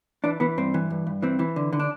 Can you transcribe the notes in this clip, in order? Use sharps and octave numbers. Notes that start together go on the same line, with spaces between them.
E3 D4
E3 B3
G2 C4
E3
G2
G2
E3 C4
E3
D3
D3
D4